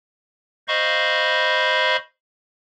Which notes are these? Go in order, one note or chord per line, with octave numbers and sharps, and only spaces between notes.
C5 D#5 F5 B5 C#6